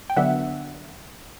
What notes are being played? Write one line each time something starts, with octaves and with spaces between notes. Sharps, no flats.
G5
D3 F#3 B3 D4 E5 F#5